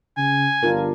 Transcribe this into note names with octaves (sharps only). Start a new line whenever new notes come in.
C#3 G#5
G1 D4 F4 A#4